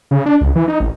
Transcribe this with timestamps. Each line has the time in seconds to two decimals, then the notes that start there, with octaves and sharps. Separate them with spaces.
0.11 C#3
0.26 D4
0.41 C#2
0.55 E3
0.68 D#4
0.80 A1